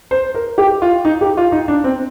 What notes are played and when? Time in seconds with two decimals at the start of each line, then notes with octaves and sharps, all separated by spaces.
0.11 C5
0.34 A#4
0.58 G4
0.82 F4
1.05 D#4
1.21 G4
1.37 F4
1.52 D#4
1.68 D4
1.84 C4